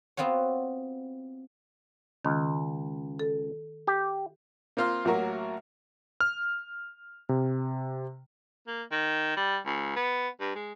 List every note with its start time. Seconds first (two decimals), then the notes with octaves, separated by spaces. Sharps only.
0.17 B3 C4 F4 F#4 C#5
2.25 C#2 D#3
3.19 A4
3.87 G4
4.77 A#3 C4 F4 C6 F6
5.05 A1 F#3 A#3 F#4 A#4 C#6
6.20 F6
7.29 C3
8.67 A#3
8.92 D#3
9.37 G3
9.66 C#2
9.96 B3
10.40 G2
10.55 G#3